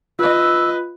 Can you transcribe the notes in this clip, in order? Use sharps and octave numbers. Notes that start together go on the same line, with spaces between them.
F4 B4 D#5 E6